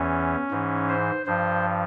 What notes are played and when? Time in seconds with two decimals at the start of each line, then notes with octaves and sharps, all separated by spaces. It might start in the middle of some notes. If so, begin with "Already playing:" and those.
Already playing: E2 E3 C#4
0.51 G#2 E3
0.89 C5
1.26 G2 F3 C5